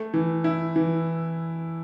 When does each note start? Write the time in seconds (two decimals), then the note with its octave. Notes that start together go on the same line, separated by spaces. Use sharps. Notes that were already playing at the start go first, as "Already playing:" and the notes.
Already playing: A3
0.14 E3
0.44 E4
0.76 E3